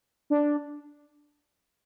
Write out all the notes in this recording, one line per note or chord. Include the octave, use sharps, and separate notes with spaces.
D4